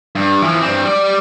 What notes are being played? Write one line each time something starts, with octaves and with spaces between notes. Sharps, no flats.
G2
E3 F3
G2 C4
G3 D5